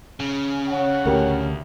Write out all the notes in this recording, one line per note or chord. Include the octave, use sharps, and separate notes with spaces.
C#3
C#5 F#5
D2 A2 G4 A#4